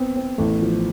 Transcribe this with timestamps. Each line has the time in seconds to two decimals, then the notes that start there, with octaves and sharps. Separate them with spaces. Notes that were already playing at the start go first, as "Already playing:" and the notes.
Already playing: B3 C4
0.16 C4
0.38 A1 A3
0.62 F3